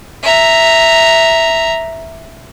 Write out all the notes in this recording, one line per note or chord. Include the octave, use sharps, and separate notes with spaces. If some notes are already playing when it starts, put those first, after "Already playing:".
E5 A#5